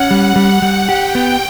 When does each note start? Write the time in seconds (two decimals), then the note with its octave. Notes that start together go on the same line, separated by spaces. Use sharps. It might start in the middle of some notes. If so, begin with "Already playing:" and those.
Already playing: C#4 F#5
0.11 G3
0.36 G3
0.62 G3
0.89 G4 G5
1.15 B3